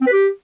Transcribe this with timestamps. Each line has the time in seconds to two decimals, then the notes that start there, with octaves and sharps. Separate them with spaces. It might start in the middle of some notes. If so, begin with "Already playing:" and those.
0.01 C4
0.07 B4
0.12 G4